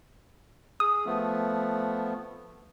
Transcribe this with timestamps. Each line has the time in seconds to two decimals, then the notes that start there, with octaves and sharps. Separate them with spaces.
0.80 G#4 D#6
1.06 F3 A3 B3